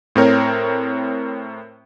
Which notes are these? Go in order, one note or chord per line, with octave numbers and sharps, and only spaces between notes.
A2 C4 A#4 C#5